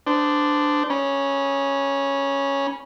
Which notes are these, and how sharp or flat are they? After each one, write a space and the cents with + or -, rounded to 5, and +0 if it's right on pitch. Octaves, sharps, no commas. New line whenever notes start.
D4 +0 C5 -25
C#4 +0 B5 -35